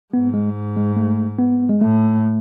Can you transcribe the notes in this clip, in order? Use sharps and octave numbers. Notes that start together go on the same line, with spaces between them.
G#2 B3
G#3
G#3
A3
B3
G#3
A2 A3